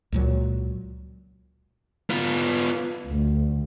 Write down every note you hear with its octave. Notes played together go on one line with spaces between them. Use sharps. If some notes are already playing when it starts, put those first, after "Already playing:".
C#2 A#2 F#3
B3 F4
D2